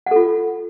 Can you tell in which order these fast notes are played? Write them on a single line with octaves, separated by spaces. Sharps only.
F#5 A4 F4